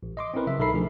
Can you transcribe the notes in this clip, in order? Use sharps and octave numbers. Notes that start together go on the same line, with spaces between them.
A1
D#5 C6 D6
C4 C#4 E4 A#4 B4
C#3 F#3 E5
B1 D#4 A4 A#4 B5 C7
F3 A3 D4 G#4